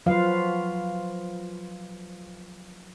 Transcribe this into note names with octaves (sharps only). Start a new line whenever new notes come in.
F3 F#3 F4 B4 F5